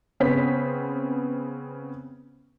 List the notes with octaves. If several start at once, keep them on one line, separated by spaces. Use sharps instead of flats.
C#3 B3 C4 C5 B6